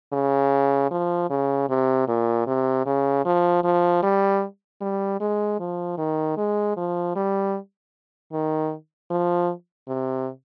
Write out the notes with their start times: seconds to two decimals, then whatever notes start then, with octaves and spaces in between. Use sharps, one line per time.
0.13 C#3
0.91 F3
1.30 C#3
1.70 C3
2.08 A#2
2.47 C3
2.86 C#3
3.26 F3
3.64 F3
4.03 G3
4.82 G3
5.21 G#3
5.60 F3
5.98 D#3
6.37 G#3
6.77 F3
7.16 G3
8.32 D#3
9.11 F3
9.88 C3